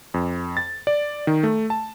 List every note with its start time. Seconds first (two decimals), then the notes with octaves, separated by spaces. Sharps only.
0.14 F2
0.57 A6
0.87 D5
1.27 D#3
1.43 A3
1.70 A5